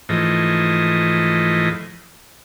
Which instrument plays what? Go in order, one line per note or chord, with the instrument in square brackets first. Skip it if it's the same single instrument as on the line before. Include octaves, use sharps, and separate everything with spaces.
[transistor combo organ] G#2 E3 F3 A3 D#5